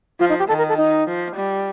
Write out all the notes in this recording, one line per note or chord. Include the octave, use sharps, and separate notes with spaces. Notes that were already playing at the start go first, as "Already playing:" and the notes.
F3 F4
D#4
G4
D#3 A4
A#4
A4
D#4
F3
G3